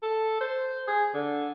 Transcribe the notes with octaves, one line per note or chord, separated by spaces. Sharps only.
A4
C5
G#4
D3